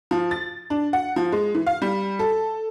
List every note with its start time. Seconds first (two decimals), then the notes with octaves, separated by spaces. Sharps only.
0.11 F3
0.31 A6
0.70 D4
0.93 F#5
1.16 F3
1.32 G#3
1.55 E3
1.67 F5
1.82 G3
2.19 A4